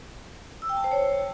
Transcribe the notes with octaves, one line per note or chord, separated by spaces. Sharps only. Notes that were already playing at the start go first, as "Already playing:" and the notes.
E6
G5
A5
C5
C#5